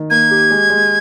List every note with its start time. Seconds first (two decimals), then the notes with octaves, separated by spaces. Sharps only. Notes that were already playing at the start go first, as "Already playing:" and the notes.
Already playing: D#3
0.10 A#3 G#6
0.31 G4
0.51 G#3
0.70 G#3